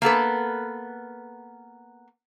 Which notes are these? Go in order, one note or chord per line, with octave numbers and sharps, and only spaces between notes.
A#3 B3 A4 B4